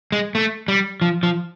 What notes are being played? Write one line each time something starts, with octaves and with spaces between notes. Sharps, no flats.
G#3
A3
G3
F3
F3